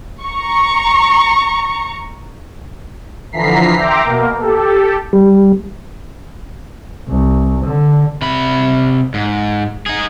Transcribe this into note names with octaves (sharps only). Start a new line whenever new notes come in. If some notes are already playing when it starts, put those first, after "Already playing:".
A#5 C#6
D3 E3 F3 A#5 B6 C7
E5 G5 A#5 C6 D6
B2 A#3 A#4
G4 A4
G3
C2
D3
C3 B5
G#2
D#4 G#4